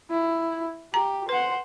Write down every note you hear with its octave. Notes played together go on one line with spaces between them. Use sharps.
E4
G4 A#5
B4 C5 F#5